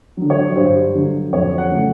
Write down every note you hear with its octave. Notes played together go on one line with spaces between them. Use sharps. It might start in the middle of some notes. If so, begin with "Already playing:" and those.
D3 F#3
C#5
G2 C5
D3 F#3
F2 C#5
F#5
C#3 F#3 A3